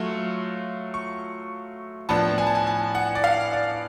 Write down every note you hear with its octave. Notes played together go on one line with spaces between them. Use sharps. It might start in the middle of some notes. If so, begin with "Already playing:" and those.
Already playing: F#3 A3 F4 C#6
C#6
A2 F3 B3 D4 A5
G#5
A5
G#5
G#5
F#5
D5
F5
D5